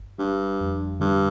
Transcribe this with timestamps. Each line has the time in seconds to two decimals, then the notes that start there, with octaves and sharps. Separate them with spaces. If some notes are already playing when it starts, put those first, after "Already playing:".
Already playing: G1
0.19 G2 G3
0.60 F2
1.00 G2 D3